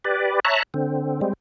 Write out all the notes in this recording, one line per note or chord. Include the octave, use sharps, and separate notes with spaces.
G4 B4 D5
C#5 E5 A5 A#5 F#6
D3 C4
G3 G#3 C4